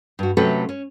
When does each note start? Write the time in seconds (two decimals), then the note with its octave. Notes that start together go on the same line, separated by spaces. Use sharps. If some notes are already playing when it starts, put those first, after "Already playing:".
0.19 G2 F#4
0.37 C3 F#3 A3 C#4 A4 B4
0.69 C#4